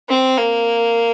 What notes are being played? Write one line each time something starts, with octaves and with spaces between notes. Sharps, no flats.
C4
A#3